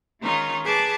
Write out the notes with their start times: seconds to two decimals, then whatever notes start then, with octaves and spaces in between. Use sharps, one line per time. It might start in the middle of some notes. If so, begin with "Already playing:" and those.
0.21 D#3 G#3 C#4 D#4 F4
0.65 G#4 B4 A5 D6 G#6